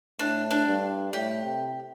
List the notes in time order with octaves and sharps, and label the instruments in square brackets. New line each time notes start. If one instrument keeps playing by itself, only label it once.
[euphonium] A2 [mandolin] D4
[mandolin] D4
[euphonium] G2
[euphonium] A2 [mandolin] G4
[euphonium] C3